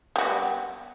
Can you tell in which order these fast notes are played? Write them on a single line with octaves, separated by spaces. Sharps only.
G3 F#4 B3